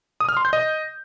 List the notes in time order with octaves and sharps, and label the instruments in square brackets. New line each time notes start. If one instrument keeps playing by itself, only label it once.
[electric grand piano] D#6
F6
C6
G6
D#5